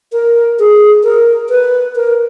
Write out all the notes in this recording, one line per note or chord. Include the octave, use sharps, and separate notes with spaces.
A#4
G#4
A#4
B4
A#4